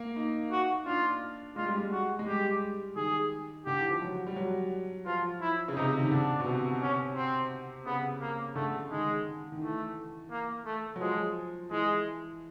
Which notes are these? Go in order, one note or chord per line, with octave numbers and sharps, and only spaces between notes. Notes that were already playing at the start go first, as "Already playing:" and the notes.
Already playing: A#3
D#4
F#4
D4 F4
G#3 F4
G3
G#3
F#4
G#3
G3 G4
D#3 G#4
D3 G4
E3
F3
F#3
G3
F#3
F3 F4
E4
C#3
C3 D#4
C#3
D#3
D3 D4
B2
C3
C#4
C4
C#3 B3
A#3
D3 A3
D#3 G#3
D#3
E3 A3
A#3
A3
F#3
F3 G#3
E3 G#3